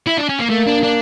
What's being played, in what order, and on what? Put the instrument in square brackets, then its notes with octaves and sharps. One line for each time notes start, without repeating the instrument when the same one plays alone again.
[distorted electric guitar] E4
D4
C#4
A#3
[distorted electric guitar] A3 [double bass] A#3
[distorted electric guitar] D4
D4